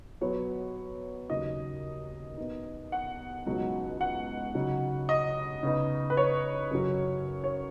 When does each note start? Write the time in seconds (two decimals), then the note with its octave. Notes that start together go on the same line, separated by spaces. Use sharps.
0.21 B2 F#3 B3 C#5
1.29 D#2 C#3 F#3 D#4 D#5
2.37 B2 B3 D#4
2.92 F#5
3.46 C#2 B2 F#3 D#4
4.01 F#5
4.55 C#3 F#3 D#4
5.09 D#5
5.63 C#3 B3 D#4
6.10 B4
6.17 C#5
6.71 F#2 C#3 F#3 C#4
7.44 C#5